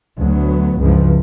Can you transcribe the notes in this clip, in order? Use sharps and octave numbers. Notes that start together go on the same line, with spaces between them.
D2 F#3 B3
C#2 G2 E3 F3